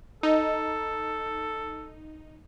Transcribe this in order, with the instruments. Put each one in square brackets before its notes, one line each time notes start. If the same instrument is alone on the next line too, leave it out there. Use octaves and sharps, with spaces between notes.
[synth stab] D#4 [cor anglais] A4